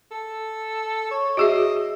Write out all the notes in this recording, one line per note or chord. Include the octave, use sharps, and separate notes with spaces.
A4
C#5
F#4 G#4 D#5 E5